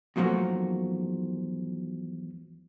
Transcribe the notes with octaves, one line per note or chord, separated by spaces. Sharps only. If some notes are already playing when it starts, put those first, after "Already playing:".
E2 G#2 F3 F#3 A3 A#3